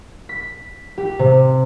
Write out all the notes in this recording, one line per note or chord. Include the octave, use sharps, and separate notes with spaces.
B6
G4
C3